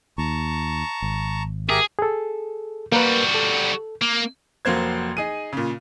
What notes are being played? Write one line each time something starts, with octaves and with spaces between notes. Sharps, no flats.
D#2 A5 A#5 C#6
G#1
G4 G#4 A#4 E5
G#4 A4
G3 A#3 F#4 A#4 B4
A4
A#3
F1 F#3 A#3 C5 G#6
D#4 G#4 D#7
A#2 C#3